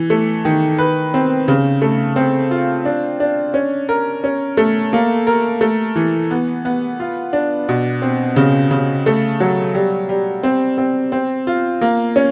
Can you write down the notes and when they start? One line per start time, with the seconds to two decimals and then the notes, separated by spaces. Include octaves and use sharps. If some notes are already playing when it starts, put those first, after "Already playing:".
Already playing: E3
0.10 A3
0.45 D#3
0.78 B4
1.14 C4
1.48 C#3
1.82 A3
2.16 C4
2.51 F4
2.85 D4
3.20 D4
3.54 C#4
3.89 A#4
4.24 C#4
4.57 A3
4.93 A#3
5.27 A#4
5.61 A3
5.96 E3
6.31 B3
6.65 B3
7.00 F4
7.33 D4
7.69 B2
8.02 C4
8.36 C#3
8.71 C#3
9.06 A3
9.40 F#3
9.74 G3
10.09 G3
10.43 C4
10.78 C4
11.12 C4
11.47 F4
11.81 A#3
12.16 C#4